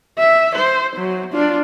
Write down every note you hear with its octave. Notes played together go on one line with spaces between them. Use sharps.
E5
C5
F#3
D4 F4